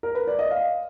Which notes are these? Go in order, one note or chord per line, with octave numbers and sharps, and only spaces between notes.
A#4
B4
D5
D#5
F5